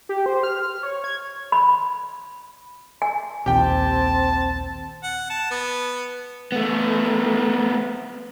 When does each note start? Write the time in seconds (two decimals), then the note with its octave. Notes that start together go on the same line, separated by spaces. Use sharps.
0.09 G4
0.26 C5
0.43 F6
0.56 F6
0.83 C#5
1.04 G#6
1.52 B5
3.02 G#5
3.46 A#1 D#2 C4 G4 G5 A5
5.03 F#5
5.30 A5
5.51 B3
6.52 A3 B3